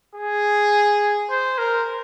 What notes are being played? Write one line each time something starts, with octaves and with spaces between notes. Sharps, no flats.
G#4
C5
A#4